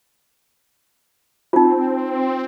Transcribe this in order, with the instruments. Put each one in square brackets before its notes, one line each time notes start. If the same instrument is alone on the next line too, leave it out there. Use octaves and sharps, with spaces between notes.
[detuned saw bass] C4 [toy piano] D#4 F4